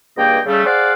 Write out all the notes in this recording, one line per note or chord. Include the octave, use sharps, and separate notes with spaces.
C#2 G2 A#3 D#5 G5
C#3 G3 A3
G#4 C5 D5 F5 F#5